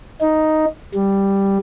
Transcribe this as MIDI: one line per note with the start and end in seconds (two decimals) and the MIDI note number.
0.21 0.66 63
0.94 1.58 55